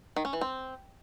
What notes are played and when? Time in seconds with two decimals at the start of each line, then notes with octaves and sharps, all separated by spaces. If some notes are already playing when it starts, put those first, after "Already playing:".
0.16 D#3
0.25 C#4
0.33 E3
0.41 C4